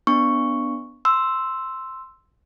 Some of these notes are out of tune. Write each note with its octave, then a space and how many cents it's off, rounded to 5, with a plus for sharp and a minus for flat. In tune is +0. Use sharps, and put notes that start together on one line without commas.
B3 +0 D4 +0 C#6 +0
C6 +0 E6 +0